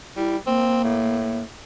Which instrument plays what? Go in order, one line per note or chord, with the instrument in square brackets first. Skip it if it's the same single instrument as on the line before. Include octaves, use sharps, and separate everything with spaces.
[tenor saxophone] G3 [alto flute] E4
[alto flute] A#3 [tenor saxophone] C4
[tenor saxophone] A2